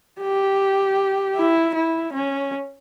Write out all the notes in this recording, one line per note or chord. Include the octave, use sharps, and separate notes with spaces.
G4
E4
E4
C#4